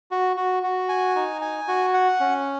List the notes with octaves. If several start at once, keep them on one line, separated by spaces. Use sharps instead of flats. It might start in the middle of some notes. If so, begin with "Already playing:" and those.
F#4
F#4
F#4
G#5
D#4
G#5
F#4
F#5
C#4